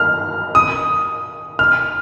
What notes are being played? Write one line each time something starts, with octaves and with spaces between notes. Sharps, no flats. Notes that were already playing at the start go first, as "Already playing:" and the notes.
Already playing: F6
D#6
F6